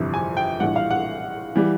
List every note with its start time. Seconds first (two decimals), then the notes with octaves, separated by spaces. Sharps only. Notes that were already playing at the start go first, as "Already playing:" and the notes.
Already playing: G1 F2 C3 E3 G3
0.14 G#5
0.37 G5
0.60 A#1 A2 E3 G3 F#5
0.76 F5
0.91 F#5
1.56 E3 G3